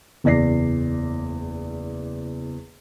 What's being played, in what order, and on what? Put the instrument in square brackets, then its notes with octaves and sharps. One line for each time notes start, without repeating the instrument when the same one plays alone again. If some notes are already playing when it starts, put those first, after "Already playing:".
[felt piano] F#1 E2 D5 A#6 C7